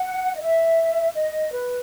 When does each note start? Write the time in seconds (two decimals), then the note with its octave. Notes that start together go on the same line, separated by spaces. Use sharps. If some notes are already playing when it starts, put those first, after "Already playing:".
Already playing: F#5
0.35 D#5
0.41 E5
1.16 D#5
1.53 B4